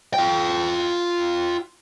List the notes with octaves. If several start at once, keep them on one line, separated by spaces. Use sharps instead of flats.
F4 G5